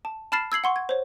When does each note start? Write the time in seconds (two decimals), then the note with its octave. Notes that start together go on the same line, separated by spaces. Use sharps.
0.05 A5
0.32 A5 B5 F6 A6 C7 E7
0.52 E6 G#6 C7 F#7
0.64 F#5 C6 C#6
0.76 G#6
0.89 C5 C#5